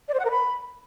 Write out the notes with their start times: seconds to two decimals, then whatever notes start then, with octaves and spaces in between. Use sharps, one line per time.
0.08 D5
0.14 C5
0.19 F#5
0.25 A#4
0.30 B5